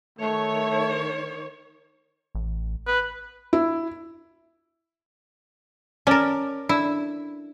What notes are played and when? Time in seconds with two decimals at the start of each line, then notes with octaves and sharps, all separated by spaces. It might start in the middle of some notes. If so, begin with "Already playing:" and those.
0.19 D#3 A3 C#5
2.35 A1
2.87 B4
3.53 E4
6.07 C#4 A#4 D5 A5
6.69 D4 E4 E6